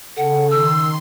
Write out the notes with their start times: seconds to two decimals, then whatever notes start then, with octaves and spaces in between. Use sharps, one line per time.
0.17 C#3 A4 F#5
0.51 D#3 C6 E6